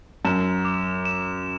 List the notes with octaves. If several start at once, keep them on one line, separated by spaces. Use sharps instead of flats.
F#2 E7
D6
E7